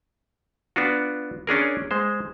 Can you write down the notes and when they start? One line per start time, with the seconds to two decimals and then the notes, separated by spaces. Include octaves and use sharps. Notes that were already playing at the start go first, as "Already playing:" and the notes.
0.76 B3 D4 F4 F#4
1.47 C#4 D4 G#4 A#4
1.91 G#3 C5